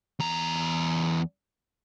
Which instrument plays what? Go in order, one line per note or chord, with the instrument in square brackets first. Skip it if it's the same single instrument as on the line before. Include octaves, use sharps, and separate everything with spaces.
[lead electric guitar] E2 A#5